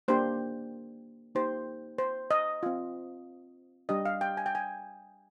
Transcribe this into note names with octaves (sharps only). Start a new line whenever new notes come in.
A#3 D4 G4 C5
A#3 D#4 G4 C5
C5
D#5
C4 F4
G3 D4 G4 D#5
F5
G5
G#5
G5
G#5